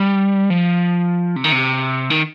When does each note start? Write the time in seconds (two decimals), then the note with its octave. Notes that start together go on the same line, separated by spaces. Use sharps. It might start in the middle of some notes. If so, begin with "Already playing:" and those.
Already playing: G3
0.50 F3
1.36 C3
1.44 D#3
1.52 C3
2.10 D#3